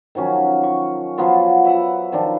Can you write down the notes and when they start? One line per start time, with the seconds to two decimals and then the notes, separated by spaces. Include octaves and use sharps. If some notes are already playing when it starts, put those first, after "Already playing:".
0.15 D#3 F3 F#3 C#4
0.63 C#6
1.18 F3 F#3 B3 F4
1.65 B4 E5 F#5
2.12 D#3 F3 D4